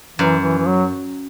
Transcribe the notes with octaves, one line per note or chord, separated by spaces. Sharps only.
F#2 E3
E3
E3
F#3